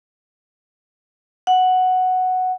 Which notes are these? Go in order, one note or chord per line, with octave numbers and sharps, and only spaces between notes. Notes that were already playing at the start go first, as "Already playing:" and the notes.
F#5